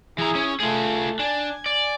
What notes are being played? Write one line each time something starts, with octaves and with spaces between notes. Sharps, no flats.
E3 E4 G#4 A#5
C#4
A3 F4 G#4
D4 G#5
D5